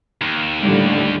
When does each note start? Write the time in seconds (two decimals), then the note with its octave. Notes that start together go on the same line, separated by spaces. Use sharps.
0.22 D#2
0.61 A2 D3 G3